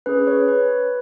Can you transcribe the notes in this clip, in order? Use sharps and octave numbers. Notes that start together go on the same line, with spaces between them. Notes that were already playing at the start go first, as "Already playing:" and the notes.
C#4 G#4 B4
B4
C#5
B4